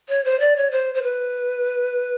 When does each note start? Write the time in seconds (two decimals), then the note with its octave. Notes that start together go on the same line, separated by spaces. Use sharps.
0.09 C#5
0.25 C5
0.40 D5
0.56 C#5
0.71 C5
0.95 C5
1.02 B4